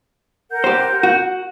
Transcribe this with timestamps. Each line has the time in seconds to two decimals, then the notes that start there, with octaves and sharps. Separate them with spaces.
0.51 A#4 F#5 G6
0.64 G4 C5
1.03 F#4